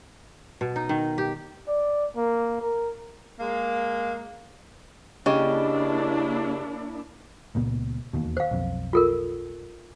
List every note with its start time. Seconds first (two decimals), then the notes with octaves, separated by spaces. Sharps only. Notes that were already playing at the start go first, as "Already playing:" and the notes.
0.61 B2
0.76 D#4
0.89 D#3
1.18 G4
1.68 D5
2.16 A#3
2.61 A#4
3.40 G#3 A#3
5.26 C#3 A#3 D4 E4 G4 D#5 G5
7.55 C#2 A#2 B3
8.13 E1 D#2 B2
8.37 C5 F5
8.51 B1 F2
8.93 F4 A4 A#4